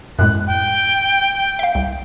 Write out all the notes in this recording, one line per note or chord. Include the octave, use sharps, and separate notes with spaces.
F#2 A2 G#3 F#6
G5
E5 F5
C2